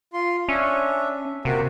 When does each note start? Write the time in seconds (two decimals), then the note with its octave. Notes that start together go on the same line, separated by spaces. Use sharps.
0.13 F4 C6
0.49 C#4 D4 E5
1.45 C3 A#3 F#4